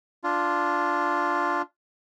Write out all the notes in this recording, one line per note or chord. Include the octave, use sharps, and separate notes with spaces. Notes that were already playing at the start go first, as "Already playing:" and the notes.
D4 F4